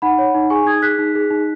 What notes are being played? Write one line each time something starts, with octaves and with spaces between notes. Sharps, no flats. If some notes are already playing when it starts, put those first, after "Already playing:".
D#4 F#5 B5
C#5
D#4
G#4 G#5 C#6
D#4 D#6 G#6
G#4 F#6 B6
D#4
G#4
D#4